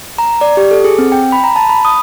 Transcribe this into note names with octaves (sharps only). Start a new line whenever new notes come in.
A#5
D5
G4
A4
G#4
C4
G5
B5
A#5
A5
B5
D#6